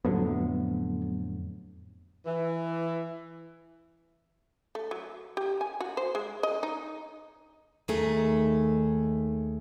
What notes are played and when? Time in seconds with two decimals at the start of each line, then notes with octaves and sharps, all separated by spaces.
0.05 F2 A2 D3 F#3 B3
2.26 E3
4.75 A3
4.91 F#3
5.37 G4
5.61 G#5
5.80 F#4
5.97 C5
6.15 G#3
6.43 D#5
6.63 D#4
7.88 D#2 D#3 A3 G#4